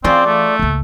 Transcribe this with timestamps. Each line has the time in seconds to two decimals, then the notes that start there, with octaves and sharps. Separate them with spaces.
0.04 C#3 E3 C4 F4 D5
0.26 A3
0.59 C#2 A#3